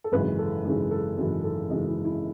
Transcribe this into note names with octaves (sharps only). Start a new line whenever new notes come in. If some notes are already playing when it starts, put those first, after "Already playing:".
A4
G#1 F#2 C#3 E3 G#3 B4
A4
G#1 F#2 C#3 E3 G#3 G#4
A4
G#1 F#2 C#3 E3 G#3 G#4
A4
G#1 F#2 C#3 E3 G#3 D#5
E4
E4